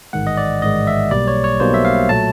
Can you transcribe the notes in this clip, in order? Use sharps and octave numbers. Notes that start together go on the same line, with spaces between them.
A1 G#2 D#3 G#3 F#5
D#5
D5
A1 G#2 D#3 G#3 D#5
E5
B1 B2 G3 A#3 D5
C#5
C#5
B1 B2 G3 A#3 C5
E5
F5
A#2 F#3 A3 A5